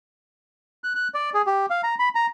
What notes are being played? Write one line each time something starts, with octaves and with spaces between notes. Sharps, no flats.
F#6
F#6
D5
G#4
G4
F5
A#5
B5
A#5